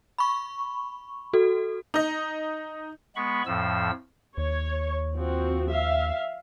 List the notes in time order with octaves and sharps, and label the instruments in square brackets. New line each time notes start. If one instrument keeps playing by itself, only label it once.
[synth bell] B5 C#6
F#4 A4
[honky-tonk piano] D#4 D#5
[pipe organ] G#3 B3 B5 C#6
F2 A2 F3 E6
[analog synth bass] D#2 [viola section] C#5
[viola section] F3 C4 F#4
E5 F5